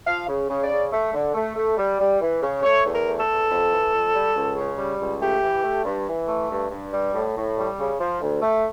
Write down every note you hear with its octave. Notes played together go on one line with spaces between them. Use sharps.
F3 F5
C#3
C#3
D5
C#3
A3
D3
A3
A3
G3
G3
E3
C#3
A3 C#5
E2
A#4
A3
A4
E2
F2
E3
F2
G3
C#2
C#3
G3
C#2
A3 G4
E3
A3
G2
E3
A3
G2
G2
G3
A2
A2
G3
C#3
F3
D2
A3